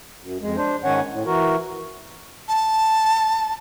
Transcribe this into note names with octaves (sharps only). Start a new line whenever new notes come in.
F#2
F2 G#3
D4 C5
G#2 D#3 C#4 C#5 F#5
A2
E3 F#4 A#4
A5